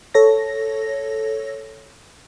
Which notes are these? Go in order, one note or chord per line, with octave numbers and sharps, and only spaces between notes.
A4 C#5 A#6